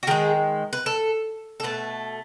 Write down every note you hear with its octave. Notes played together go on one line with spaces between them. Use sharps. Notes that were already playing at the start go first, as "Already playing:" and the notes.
F#4
D#3 G#3 G#4
B4
A4
A4
B2 A3 B4